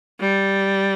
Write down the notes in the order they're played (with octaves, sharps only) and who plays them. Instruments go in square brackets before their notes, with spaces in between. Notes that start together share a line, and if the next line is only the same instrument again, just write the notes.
[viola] G3